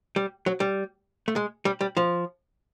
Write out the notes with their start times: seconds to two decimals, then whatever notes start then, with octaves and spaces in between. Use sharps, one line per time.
0.16 G3
0.46 F#3
0.60 G3
1.28 A3
1.36 G#3
1.65 G3
1.81 G3
1.97 F3